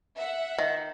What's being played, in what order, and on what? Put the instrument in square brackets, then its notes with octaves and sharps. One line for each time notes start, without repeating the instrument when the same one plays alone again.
[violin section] E5 F#5
[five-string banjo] D#3